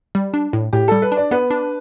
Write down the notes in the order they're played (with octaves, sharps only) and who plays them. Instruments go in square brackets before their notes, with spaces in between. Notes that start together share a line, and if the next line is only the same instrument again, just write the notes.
[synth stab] G3
D4
A2
[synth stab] A2 [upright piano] G4
[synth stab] G3 [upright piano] A4
[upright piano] B4
[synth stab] D4
[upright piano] D5
[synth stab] B3 [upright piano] B4
[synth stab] D4